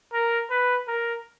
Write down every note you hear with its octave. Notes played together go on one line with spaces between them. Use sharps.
A#4
B4
A#4